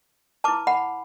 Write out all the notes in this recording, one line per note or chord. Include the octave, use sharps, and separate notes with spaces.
E4 B4 A5 D6
F#5 B5